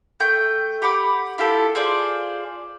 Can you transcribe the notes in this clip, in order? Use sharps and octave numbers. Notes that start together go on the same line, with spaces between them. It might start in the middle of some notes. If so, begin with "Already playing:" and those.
A3 G5 G6
G4 F#5 B5 D6
E4 F4 G4 A4
F4 G#4 C5 D5